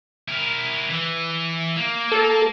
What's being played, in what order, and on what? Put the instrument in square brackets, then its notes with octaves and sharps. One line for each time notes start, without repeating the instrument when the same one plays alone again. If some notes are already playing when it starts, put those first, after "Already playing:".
[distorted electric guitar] E4 A#4
E3
A#3
[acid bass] A4